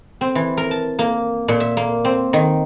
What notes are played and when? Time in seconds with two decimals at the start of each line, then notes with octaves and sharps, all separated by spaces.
0.21 C4
0.35 E3
0.57 A#4
0.71 A5
0.99 A#3
1.48 A#2
1.60 E5
1.77 A#3
2.05 C4
2.33 D#3